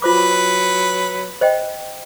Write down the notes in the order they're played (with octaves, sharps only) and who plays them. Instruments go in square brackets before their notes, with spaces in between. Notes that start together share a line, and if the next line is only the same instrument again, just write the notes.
[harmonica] F#3 B4 [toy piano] F4 C5 D6
[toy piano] C5 D#5 G5